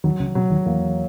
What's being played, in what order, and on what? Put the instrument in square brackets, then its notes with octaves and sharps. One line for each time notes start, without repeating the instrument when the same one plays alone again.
[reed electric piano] D#2 D#3 [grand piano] F#3
[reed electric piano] C#2 C#3
[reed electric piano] B2 [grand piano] F#3
[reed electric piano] D#2 D#3
[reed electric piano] E2 E3 [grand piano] A#3